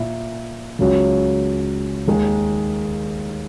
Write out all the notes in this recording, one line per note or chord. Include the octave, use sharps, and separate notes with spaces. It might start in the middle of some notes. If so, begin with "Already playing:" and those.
Already playing: A#2 A#3 E4
C#2 C#3 F#3
D#2 D#3 G#3 D#4